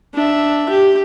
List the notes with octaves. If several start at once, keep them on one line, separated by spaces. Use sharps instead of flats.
D4 E5
G4